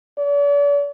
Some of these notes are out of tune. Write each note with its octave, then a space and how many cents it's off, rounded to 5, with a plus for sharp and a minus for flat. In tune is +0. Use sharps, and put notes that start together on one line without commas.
D5 -45